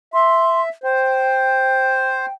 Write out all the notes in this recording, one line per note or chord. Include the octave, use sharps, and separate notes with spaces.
E5 C6
C5 G5